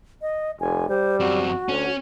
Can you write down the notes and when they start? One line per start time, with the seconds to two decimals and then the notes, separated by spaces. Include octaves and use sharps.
0.22 D#5
0.60 F1 G#5
0.89 G3 C5
1.20 F#2 C4 F#4
1.69 D2 C#4